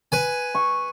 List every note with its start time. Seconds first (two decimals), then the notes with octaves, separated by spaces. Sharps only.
0.12 B4 G#5
0.55 C#6